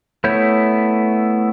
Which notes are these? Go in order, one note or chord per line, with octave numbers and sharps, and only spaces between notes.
A3 B3 E4 C#5 G6